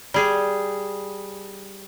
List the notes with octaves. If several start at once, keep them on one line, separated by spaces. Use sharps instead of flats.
G3 G#4